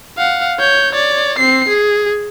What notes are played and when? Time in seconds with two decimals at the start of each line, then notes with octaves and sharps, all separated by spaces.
0.18 F5 F#5
0.59 C#5 G6
0.93 C#5 D5
1.38 C4 C7
1.69 G#4